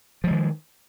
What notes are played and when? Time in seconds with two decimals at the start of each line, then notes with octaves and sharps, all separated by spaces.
0.24 F3
0.27 G#3
0.31 D#3